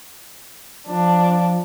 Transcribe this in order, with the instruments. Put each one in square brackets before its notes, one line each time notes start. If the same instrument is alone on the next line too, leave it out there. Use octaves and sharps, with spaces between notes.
[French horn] F3 [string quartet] D4